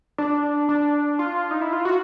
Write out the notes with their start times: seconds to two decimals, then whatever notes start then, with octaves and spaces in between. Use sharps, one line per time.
0.18 D4
0.69 D4
1.19 F4
1.51 D#4
1.62 E4
1.73 F4
1.85 F#4